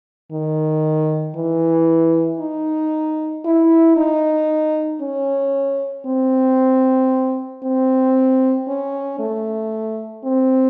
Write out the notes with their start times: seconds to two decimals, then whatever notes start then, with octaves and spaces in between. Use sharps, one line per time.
0.32 D#3
1.36 E3
2.40 D#4
3.45 E4
3.97 D#4
5.01 C#4
6.06 C4
7.63 C4
8.68 C#4
9.19 A3
10.24 C4